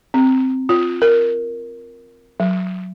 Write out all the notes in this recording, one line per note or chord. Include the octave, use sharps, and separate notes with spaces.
C4
F4
A#4
F#3